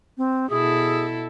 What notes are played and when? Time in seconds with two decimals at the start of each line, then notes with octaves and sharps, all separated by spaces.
0.17 C4
0.50 B2 E4 G#4 A4